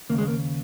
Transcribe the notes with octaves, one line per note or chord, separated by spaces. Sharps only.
D#2 C#3 A#3
G#3
A#3